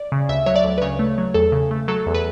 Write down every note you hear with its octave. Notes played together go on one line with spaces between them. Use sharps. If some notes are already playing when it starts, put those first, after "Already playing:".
Already playing: D5
C#3
D2 E5
F#3 C#5
D5
D2
B4
C#3 C#5
A3
F#3
E2 A4
C#3
A3
F#3 A4
E2
B4